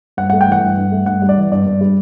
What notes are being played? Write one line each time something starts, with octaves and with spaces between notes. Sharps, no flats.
G2 F#5
A3 F#5
G5
E3 F#5
G2
G2
A3
G2 F#5
G3
D5
E3
G2 D5
G2
G3